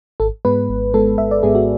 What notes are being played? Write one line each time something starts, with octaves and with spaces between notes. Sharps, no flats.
G#1 A4
G#2 G#3 B3 B4
G#1
G#2 G#3 B3 A4
G#1 E5
D5
G#2 G#3 B3 G#4
F#4